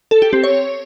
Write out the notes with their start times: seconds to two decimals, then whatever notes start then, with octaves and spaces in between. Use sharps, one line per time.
0.11 A4
0.22 G4
0.33 C4
0.43 C#5